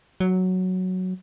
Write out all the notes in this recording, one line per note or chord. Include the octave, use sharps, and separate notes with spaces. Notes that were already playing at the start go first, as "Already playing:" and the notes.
F#3